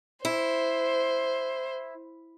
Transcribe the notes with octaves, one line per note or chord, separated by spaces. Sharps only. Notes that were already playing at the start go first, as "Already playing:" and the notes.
E4 C5